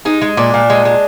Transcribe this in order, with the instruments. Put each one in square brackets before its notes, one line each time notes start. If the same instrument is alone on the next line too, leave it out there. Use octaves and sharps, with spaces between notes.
[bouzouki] G#3 D#4
G#3
A#2 D4
A#2
G#3
G#3